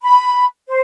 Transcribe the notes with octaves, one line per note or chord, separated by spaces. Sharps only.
B5
C5